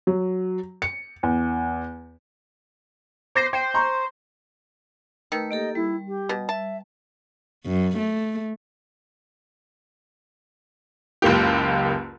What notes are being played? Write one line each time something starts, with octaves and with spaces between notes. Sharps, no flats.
F#3
C#7
E2
C5 D6 A#6 C7
C5 G5
A#5 C6 C#6
D#3 A3 B4 E6
A#3 G4 A4 D#5
G3 E4
G4
B2
E5 A5
F#2
A3
F#1 C#2 A#3 G4